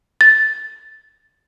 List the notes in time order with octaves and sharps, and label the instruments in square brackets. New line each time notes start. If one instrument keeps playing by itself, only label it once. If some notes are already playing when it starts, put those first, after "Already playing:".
[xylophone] A6